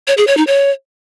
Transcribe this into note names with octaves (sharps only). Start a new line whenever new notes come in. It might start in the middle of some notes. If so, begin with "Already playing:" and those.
C#5
G#4
C#5
D#4
C#5